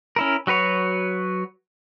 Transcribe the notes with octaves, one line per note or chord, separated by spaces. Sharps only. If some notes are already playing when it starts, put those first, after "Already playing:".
C#4 E4 A#4
F#3 F#4 B4 C#5